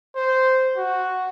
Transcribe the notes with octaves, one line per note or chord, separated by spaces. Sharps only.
C5
F#4